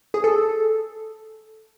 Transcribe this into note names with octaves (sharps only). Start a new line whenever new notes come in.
G#4
A4